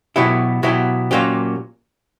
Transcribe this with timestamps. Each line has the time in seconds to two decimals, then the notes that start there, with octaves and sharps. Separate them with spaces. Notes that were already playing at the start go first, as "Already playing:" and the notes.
0.16 B2 F#3 B3 E4 G4
0.63 B2 F#3 B3 E4 G4
1.11 A#2 F#3 A#3 C#4 G4